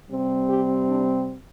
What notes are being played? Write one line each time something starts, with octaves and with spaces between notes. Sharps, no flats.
C3 G3 C4
G4
D4